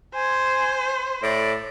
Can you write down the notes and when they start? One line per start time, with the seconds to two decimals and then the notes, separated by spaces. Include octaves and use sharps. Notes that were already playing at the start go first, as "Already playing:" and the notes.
0.15 C5 G#5
1.23 A2 D5